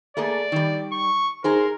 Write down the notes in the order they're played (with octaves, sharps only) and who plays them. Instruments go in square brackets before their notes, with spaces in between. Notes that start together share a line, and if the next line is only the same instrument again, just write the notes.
[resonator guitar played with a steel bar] A3 A#3 G#4 [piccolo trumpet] D5
[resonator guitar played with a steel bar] D#3 G3
[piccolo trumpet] C#6
[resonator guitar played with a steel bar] D#4 G#4 C5 [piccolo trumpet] A#4